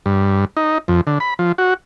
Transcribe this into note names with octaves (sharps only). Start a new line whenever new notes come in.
G2
D#4
F2
D3
B5
F3
F#4